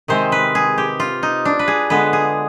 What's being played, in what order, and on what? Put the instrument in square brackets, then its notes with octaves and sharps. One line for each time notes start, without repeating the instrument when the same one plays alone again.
[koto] C3 D#3 G#3 C4 C5
B4
G#4
G4
F4
D#4
D4
B4
G#4
D3 G#3 B3 B4
G#4